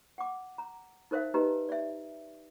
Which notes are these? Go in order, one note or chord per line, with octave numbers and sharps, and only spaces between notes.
F#5 D6
A#5
D#4 A#4 C5 E5 F5
D#4 G4 B4 D#5 A#5
D5 E5